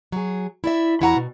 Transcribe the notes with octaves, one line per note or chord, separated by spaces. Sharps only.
F#3 G#4
E4 D5 E5
E2 E4 F#4 F#5 G#5 A#5
B2